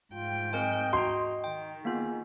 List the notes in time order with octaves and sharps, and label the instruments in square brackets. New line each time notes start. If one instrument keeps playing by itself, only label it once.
[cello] G#2 G5 [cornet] F4
[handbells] C4 A#4 G#5 [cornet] D#5
[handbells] F#4 A#5 [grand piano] C6
[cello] D#3 [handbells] G5
[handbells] A#3 B3 F4 [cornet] G#4